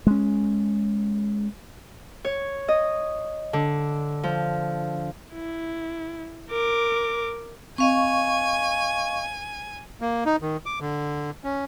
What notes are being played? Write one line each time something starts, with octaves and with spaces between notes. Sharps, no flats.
G#3 C#4
C#5
D#5
D3
F3
E4
A#4 D6
C4 D#5 F5 G#5 C#6
A#3
D#4
D#3
D6
D3
C#4